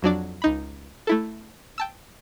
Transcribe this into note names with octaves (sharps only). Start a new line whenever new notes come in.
F2 F#3 D4 D5
C#2 D#4 B5
A3 E4 A4
G5 A5 E6